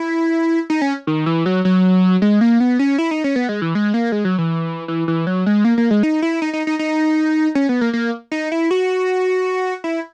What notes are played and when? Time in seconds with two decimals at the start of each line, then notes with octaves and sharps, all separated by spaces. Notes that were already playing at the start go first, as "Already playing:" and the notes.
Already playing: E4
0.70 D#4
0.82 C#4
1.07 D#3
1.26 E3
1.46 F#3
1.65 F#3
2.22 G#3
2.41 A#3
2.60 B3
2.79 C#4
2.98 E4
3.11 D#4
3.24 C#4
3.36 B3
3.49 G#3
3.62 E3
3.75 G#3
3.94 A#3
4.12 G#3
4.25 F#3
4.38 E3
4.88 E3
5.08 E3
5.27 F#3
5.46 G#3
5.64 A#3
5.78 A#3
5.91 G#3
6.03 D#4
6.22 E4
6.42 D#4
6.53 D#4
6.67 D#4
6.79 D#4
7.55 C#4
7.69 B3
7.81 A#3
7.93 A#3
8.32 D#4
8.52 E4
8.71 F#4
9.84 E4